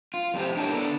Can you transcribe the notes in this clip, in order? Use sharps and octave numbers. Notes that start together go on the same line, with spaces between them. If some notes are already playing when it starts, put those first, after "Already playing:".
F4
F2 A2 G4 C5
D4 E4 G4 A#4 C#5 A5
D3 B3 D4 A4